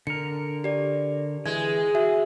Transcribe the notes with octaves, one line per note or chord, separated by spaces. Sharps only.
D3 A#4 C#7
G4 D5
E3 G#3 G#6
F#4 G#4 E5